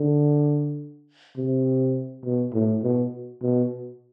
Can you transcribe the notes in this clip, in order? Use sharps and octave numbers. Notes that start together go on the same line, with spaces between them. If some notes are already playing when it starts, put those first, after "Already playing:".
Already playing: D3
C3
B2
A2
B2
B2